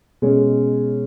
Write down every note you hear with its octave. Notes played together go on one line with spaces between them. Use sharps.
B2 G#3 C#4